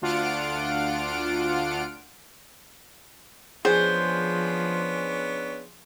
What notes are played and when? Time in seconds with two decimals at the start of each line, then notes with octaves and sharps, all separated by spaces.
0.02 D2 D4 F4 F#5 F6 D7
3.65 F3 B3 C#4 D4 G#4 C5